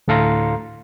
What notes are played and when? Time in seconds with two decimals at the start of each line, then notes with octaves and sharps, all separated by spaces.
0.08 D2 A2 A4 F5 A#5 C6